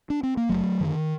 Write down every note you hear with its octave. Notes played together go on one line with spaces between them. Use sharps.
D4
C4
A#3
F#1 F#3 A3
F#2 D3 D#3 G3